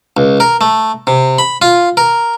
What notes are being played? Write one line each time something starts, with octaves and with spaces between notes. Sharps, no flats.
C#2
A#4
A3
C3
B5
F4
A#4